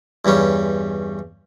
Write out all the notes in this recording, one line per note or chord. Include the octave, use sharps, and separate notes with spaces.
E2 G2 G3 C#4